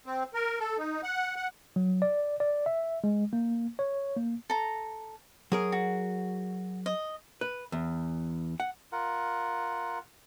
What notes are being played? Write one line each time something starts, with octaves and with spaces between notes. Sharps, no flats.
C4
A#4
A4
D#4
F#5
F#5
F#3
D5
D5
E5
G#3
A#3
C#5
A#3
A4 A#5
F#3 G#4 A#4 D#6
F#4
D#5
B4
E2
F#5
F4 A#4 F#5